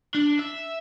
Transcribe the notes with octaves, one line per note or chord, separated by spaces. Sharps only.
D4
E5